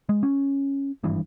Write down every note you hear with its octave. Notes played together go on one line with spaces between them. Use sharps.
G#3
C#4
G#1 G2 E3